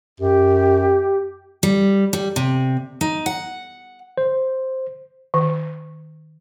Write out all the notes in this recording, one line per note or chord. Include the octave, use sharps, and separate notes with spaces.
F#2 G4
G3
G3
C3
D#4
F#5
C5
D#3